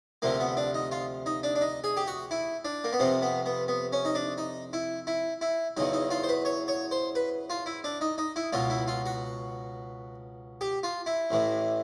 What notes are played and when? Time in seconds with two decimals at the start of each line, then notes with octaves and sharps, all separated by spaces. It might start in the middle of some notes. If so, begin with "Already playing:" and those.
0.22 D2 C3 F3 A#3
0.40 B3
0.57 D4
0.74 D#4
0.91 F4
1.26 D#4
1.43 D4
1.55 D4
1.61 D#4
1.84 G#4
1.97 G4
2.07 F#4
2.31 E4
2.65 D4
2.84 A#3
2.93 B3
2.99 F2 C3 F3 C4
3.22 B3
3.46 B3
3.68 B3
3.93 C#4
4.05 D#4
4.15 D4
4.38 D#4
4.73 E4
5.07 E4
5.41 E4
5.77 E2 C#3 F#3 D#4
5.93 D#4
6.10 F4
6.23 C5
6.29 B4
6.45 C#5
6.68 C#5
6.91 C5
7.15 B4
7.50 F4
7.66 E4
7.84 D4
8.01 D#4
8.18 D#4
8.36 E4
8.53 C#2 B2 F#3 F4
8.70 E4
8.88 F4
9.06 F#4
10.61 G4
10.83 F4
11.06 E4
11.30 A1 A2 E3